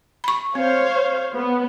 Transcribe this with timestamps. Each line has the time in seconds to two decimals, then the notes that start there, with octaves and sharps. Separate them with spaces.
0.24 B5 C#6
0.55 C4 C5 C#5 F5
1.36 B3